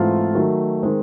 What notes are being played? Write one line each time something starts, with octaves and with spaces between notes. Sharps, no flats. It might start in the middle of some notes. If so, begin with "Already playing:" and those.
Already playing: G#2 E3 A3 C4 F4
D#3 F#3 A3
D#3 G#3 C4